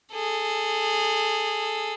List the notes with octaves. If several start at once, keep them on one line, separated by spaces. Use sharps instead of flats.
G#4 A4